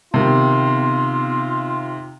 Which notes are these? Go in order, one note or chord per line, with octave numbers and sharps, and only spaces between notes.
C3 D#3 B3 F4